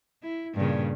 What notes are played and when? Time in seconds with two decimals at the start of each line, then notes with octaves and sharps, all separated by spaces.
0.23 E4
0.55 G2 A#2 C#3